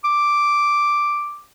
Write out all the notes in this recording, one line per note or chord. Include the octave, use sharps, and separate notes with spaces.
D6